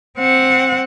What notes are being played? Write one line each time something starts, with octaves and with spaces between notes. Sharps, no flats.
C4 F#5